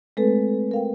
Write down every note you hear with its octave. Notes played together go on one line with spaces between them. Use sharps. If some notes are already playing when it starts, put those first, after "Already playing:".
G#3 A3 C4 A4 B4
A#4 F5 G5